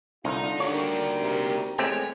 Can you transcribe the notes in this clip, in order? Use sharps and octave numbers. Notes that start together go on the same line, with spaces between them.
C2 D3 D#4 F4 A#5
D#2 G3 D4 F#4 A#4 C#5
C3
E2 G#3 A3 C4 G4 C#5